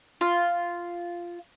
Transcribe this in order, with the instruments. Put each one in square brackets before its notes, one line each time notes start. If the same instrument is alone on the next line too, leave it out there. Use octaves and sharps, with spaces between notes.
[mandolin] F4